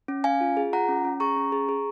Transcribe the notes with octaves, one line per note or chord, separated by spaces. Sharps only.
C#4
C#4 F5 G#5
F4
G#4
F4 F#5 A#5
C#4
C#4
G#4 A#5 C#6
C#4
G#4
G#4